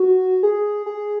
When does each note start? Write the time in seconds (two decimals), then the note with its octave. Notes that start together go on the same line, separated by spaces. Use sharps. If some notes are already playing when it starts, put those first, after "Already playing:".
Already playing: F#4
0.43 G#4
0.86 G#4